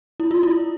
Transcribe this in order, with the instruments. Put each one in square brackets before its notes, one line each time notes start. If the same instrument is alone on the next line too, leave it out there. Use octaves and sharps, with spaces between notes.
[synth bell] E4
F4
E4